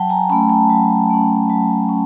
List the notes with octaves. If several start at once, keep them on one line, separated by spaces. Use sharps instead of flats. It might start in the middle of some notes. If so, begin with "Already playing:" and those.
Already playing: F#3 G5 A5
G#5 A#5
A3 C#4 A5 B5
G5 A5
F#3
A3 C#4
F#3
C#4